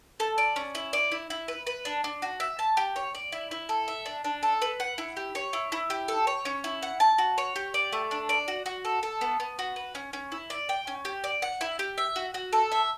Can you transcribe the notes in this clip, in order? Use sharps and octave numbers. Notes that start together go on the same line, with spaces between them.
A4
D5
C#4
E4
D5
E4
E4
B4
B4
D4
D4
F#4
E5
A5
G4
C#5
D5
E4
E4
A4
E5
D4
D4
A4
B4
F#5
E4
G4
C#5
E4
E4
G4
A4
C#5
C#4
E4
F#5
A5
F#4
C#5
G4
D5
A3
D4
D5
F#4
F#4
A4
A4
B3
B3
F#4
B4
C#4
C#4
E4
D5
G5
C#4
G4
D5
F#5
E4
G4
E5
F#4
F#4
A4
E5